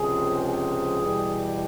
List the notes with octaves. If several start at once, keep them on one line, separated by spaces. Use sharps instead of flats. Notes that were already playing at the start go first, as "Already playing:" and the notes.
Already playing: C#2 C3 F3 G#4
G#4
E2 B2 G3